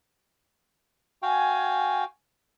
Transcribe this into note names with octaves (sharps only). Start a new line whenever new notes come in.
F#4 F5 G5 G#5